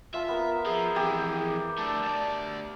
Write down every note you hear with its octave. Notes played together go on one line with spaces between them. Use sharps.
F4 E5 F5 A5
B3 A#4 A#5
F3 G#4 E5
F2 E3 G4
A3 D4 A5
D2 D5